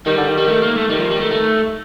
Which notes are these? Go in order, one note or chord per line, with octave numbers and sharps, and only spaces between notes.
D#3 G3
D3
D#3
G3
A3
A#3
A3
D#3 G3
F3
G3
A3
A3